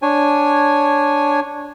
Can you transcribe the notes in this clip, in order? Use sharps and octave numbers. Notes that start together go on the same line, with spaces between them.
D4 C#5 G#5